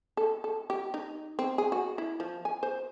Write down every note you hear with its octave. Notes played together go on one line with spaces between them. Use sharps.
A4
A4
G4
D#4
C4
G#4
F#4
E4
F3
G#5
C5